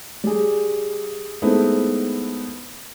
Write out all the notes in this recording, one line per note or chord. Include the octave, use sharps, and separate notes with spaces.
G3 G#4
G#3 A3 B3 C4 D#4 E4